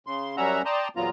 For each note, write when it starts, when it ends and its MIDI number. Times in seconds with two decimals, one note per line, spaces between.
0.07 0.36 49
0.07 0.36 84
0.37 0.62 42
0.37 0.62 55
0.37 0.62 61
0.37 0.62 76
0.37 0.62 78
0.37 0.62 82
0.65 0.88 74
0.65 0.88 79
0.65 0.88 81
0.65 0.88 82
0.65 0.88 84
0.65 0.88 87
0.96 1.10 40
0.96 1.10 46
0.96 1.10 54
0.96 1.10 59
0.96 1.10 65
0.96 1.10 82